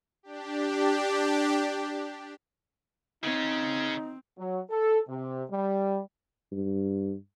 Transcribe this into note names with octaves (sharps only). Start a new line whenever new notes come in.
D4 G4
C#3 C4 C#4 D#4
F#3
A4
C3
G3
G2